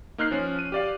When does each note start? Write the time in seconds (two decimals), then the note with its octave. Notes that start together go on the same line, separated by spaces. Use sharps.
0.18 A#3 D#4 F6 F#6 C7
0.31 F3 C#4
0.59 D#7
0.72 G4 D5 F5